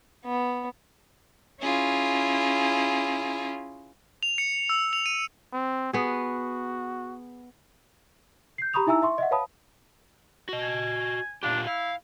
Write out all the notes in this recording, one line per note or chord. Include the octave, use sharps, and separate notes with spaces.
B3
C#4 E4 F4 G#4
F7
C#7
E6
F7
D#7
C4
B3 F#4 G#4
G6 C7
G4 A#5 B5 C#6 D#6 F7
D#4 E4 E5 G#5 A#5 E6
E5 C6 C#6
D#5 E5 F#5
B4 C#5 F5 A5 B5 D#6
F#4 D#5
G#5
A#2 D4 F4 G4
E4 F5